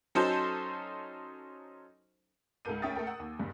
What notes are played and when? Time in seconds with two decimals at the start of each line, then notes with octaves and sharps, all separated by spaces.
0.15 F#3 C#4 D#4 A4 C5
2.65 C#2 G#2 A4 A#4 G6 D#7
2.82 D2 C#4 E5 G5 D#6 A6
2.96 A3 A4 A#4 G5
3.07 F#5 E6
3.20 D#2
3.39 F#1 G2